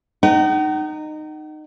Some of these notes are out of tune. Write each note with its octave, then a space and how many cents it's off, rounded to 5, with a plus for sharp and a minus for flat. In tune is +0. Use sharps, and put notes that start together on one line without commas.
D#4 -20 F#5 +40